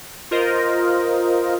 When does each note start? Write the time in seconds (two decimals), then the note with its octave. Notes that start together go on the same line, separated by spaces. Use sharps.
0.31 F4 A#4 C5 D#5